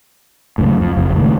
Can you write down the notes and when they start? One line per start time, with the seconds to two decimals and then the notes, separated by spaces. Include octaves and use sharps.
0.58 C#2 F#2 A2
0.79 F2
0.97 F#1 F2 F3
1.16 C#2 A2 D#3